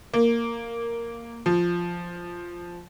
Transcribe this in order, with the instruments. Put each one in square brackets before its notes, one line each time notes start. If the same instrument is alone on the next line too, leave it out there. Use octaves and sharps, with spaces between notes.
[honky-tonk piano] A#3
F3